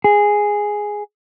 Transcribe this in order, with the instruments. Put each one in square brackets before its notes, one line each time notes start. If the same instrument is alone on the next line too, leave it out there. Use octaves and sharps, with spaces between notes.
[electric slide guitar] G#4